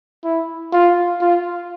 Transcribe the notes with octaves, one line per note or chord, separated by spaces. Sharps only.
E4
F4
F4